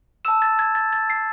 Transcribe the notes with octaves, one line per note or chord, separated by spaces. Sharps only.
A5 E6 E7
A6
G#6
A6
A6
C7